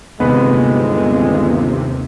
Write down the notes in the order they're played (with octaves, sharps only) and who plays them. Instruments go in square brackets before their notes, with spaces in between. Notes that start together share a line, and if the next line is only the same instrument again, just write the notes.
[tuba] G1 [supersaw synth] D#2 C3 [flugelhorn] G#3 [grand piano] B3 B4